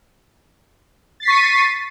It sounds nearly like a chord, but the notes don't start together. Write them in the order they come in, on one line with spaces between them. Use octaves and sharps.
A6 C7 B6 C#6 D#7